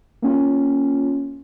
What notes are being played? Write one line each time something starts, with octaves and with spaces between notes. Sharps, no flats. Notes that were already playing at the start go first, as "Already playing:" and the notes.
A#3 C#4 F4